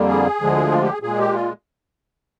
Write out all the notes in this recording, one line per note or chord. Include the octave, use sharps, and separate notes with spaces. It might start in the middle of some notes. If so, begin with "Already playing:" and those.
Already playing: F2 D3 G3 A#3
G#4
D2 D3 F3 G#3
F4
G4
G#4
A#2 G#4
G#3
G4
F4